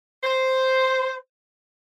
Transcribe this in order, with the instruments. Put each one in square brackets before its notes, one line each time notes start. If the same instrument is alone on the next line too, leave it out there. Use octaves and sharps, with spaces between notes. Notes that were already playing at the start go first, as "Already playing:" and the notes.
[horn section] C5